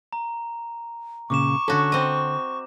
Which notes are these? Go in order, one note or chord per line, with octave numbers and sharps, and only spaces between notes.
A#5
A#2 C#3 C#6 D6 E7
D3 C#4 F#4 A4
C4 D#5